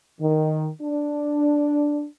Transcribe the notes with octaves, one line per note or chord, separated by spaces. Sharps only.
D#3
D4